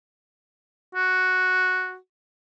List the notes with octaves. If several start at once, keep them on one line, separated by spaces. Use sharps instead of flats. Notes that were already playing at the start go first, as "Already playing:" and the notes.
F#4